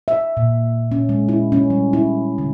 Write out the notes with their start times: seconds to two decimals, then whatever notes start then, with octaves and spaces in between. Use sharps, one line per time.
0.08 E5
0.37 A#2
0.92 C#4
1.09 G#3
1.29 E4
1.52 C#4
1.70 G3
1.93 E4
2.38 D3